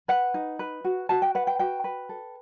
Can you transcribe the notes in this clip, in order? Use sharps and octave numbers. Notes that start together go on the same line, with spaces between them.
B4 F#5
D#4
B4
F#4
F#4 A5
G5
B4 F#5
G5
F#4 G5
B4
A4